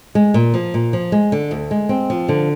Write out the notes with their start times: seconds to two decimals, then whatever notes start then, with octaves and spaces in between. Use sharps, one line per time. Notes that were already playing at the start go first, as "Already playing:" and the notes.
0.15 G#3
0.34 A#2
0.54 F3
0.74 A#2
0.93 F3
1.12 G#3
1.32 D3
1.51 D2
1.71 G#3
1.89 C4
2.10 F3
2.29 D3